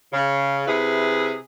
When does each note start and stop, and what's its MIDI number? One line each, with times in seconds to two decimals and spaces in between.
0.13 0.67 49
0.67 1.35 48
0.67 1.35 64
0.67 1.35 68
0.67 1.35 71